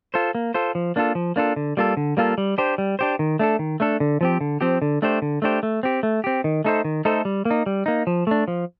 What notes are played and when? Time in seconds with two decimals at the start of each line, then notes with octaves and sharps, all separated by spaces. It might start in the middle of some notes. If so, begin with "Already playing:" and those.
0.14 F4 A4 C5
0.35 A#3
0.54 F4 A4 C5
0.75 F3
0.96 A#3 D4 F4 A4
1.15 F3
1.36 A#3 D4 F4 A4
1.56 D3
1.77 G3 A#3 F4 A4
1.97 D3
2.17 G3 A#3 F4 A4
2.38 G3
2.58 D4 G4 C5
2.78 G3
2.99 D4 G4 C5
3.19 D#3
3.39 A3 D4 A4
3.59 D#3
3.80 A3 D4 A4
4.00 D3
4.21 F3 C4 G4
4.41 D3
4.61 F3 C4 G4
4.82 D3
5.02 A3 D4 G4 C5
5.22 D3
5.42 A3 D4 G4 C5
5.63 A3
5.83 C4 G4
6.03 A3
6.24 C4 G4
6.44 D#3
6.65 A3 D#4 A4 C5
6.85 D#3
7.05 A3 D#4 A4 C5
7.25 G3
7.45 A#3
7.51 D#4
7.66 G3
7.86 A#3 D#4
8.07 F3
8.27 A3 D4
8.48 F3